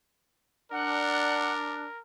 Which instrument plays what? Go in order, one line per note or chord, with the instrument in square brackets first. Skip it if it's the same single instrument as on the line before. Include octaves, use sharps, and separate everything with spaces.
[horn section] D4 [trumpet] A#4 [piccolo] F#5